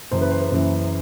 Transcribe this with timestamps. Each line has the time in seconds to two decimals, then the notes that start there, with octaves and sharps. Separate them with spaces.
0.11 F#1 F#2 E3 C5
0.21 B4
0.31 C5
0.42 B4
0.51 F#1 F#2 E3